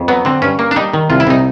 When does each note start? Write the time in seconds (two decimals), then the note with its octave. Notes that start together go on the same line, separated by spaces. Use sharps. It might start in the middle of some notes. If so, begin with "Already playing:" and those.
Already playing: F2
0.08 F#3 B3
0.25 D3 C4
0.42 G2 C#4
0.59 A#3
0.71 D4
0.76 G3 D#4
0.94 D#3
1.10 C2 F4
1.20 E4
1.27 C2 D#4